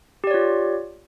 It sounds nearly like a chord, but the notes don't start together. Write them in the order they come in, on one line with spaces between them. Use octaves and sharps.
G4 D5 C#5 F4